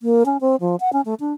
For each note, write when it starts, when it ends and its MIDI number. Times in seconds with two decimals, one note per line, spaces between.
0.01 0.23 58
0.26 0.37 61
0.41 0.56 60
0.60 0.76 53
0.80 0.92 78
0.93 1.01 61
1.05 1.14 57
1.20 1.33 62